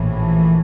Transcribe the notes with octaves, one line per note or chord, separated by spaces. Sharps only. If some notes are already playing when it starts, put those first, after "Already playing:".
Already playing: A#1 A2 E3